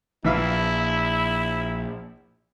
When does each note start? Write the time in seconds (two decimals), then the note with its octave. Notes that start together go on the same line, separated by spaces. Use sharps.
0.24 A#1 E3 E4 E5 F5